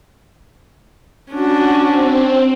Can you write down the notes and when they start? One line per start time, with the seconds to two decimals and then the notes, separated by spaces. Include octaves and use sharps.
1.33 C#4 D4 F#4
1.84 C4